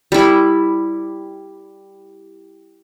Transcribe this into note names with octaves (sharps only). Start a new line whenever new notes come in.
G3 E4